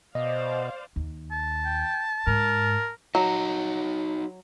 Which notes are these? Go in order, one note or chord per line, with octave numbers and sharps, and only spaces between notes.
B2 C5 D5 D#5 F5
D#2
A5
G5
G#2 A#4
F#3 D#4 F#4 D#5